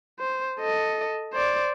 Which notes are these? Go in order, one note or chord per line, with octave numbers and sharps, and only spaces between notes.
C5
A4 D#5
C5 D5